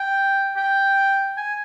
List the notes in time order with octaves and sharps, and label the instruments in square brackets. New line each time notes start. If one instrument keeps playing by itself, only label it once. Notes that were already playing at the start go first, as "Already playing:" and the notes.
Already playing: [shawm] G5
G5
G#5